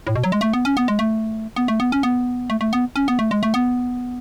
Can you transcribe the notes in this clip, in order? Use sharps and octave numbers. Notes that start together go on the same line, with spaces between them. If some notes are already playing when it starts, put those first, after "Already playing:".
A2
B2
F#3
G#3
A3
B3
C#4
B3
G#3
A3
B3
A3
B3
C#4
B3
A3
A3
B3
C#4
B3
A3
G#3
A3
B3